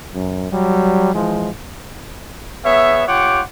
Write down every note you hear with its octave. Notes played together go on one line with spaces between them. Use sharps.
F#2
F#3 G3
E3 F3 G#3
B3 G#4 C#5 E5
F4 G4 C#5 F#5 G5 D6